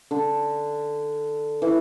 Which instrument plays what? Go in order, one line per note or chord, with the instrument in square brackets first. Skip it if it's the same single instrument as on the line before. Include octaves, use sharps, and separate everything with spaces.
[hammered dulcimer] D3
E3